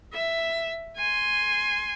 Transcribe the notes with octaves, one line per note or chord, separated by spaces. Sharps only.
E5
G#5 C6